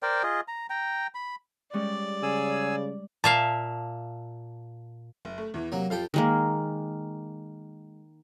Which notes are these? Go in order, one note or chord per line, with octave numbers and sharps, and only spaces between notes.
A#4 C5 D5 G5
F4 G#4 D#5
A#5
G5 A#5
B5
G3 G#3 C#4 D5
C#3 G#4 G#5 E6
A#2 E5 F5 A5
F#1
A3
E2 E3
C3 F#3 A#3
F2 G4 A4 F5 G5
D#3 G#3 A#3